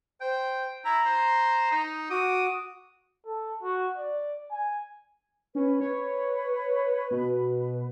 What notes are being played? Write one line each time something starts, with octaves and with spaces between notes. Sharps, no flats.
C5 G5
E4 A#5
C5
D#4
F#4 D6 D#6
A4
F#4
D5
G#5
C#4 B4
B4 C#5
B2